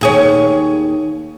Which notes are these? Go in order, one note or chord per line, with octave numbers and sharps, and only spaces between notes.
D#2 G#4 C#5